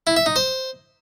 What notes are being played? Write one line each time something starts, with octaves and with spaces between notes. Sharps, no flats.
E4
E5
D#4
C5